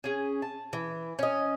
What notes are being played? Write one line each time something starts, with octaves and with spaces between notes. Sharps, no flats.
C#4 G#4
A5
E3
C#4 D#5